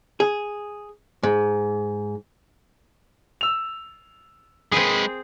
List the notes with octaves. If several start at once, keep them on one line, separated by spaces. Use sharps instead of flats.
G#4
G#2
E6 F7
G#3 C4 G#4 B4